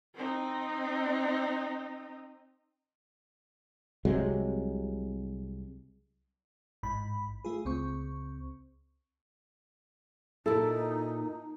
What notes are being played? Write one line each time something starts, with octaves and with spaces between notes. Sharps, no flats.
C4 D#4
C2 C3 F#3 G#3
A1 G#2 B5
A3 F4 G#4
C#2 C4 C#6
A#2 D#4 E4 A4